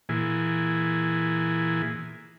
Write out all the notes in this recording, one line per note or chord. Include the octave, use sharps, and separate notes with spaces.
A#2 E3 G#4